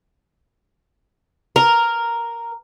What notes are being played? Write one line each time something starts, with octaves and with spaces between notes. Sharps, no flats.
A#4